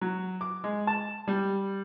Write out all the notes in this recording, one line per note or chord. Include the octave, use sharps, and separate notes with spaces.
F#3
D6
G#3
A5
G3